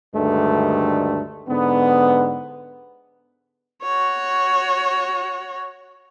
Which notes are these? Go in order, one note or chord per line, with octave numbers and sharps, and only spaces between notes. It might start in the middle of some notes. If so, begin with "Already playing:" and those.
D2 G2 D#3 G#3 A3
G#2 D3 B3
F#4 C#5